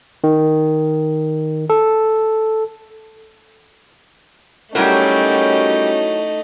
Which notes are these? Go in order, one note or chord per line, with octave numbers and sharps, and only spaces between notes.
D#3
A4
F#3 G3 A3 C#4 D#4 E4 G4 A#4